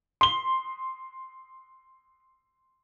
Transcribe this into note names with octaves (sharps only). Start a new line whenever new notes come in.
C6 G7